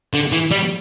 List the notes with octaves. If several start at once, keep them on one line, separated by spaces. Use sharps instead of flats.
D3
E3
G3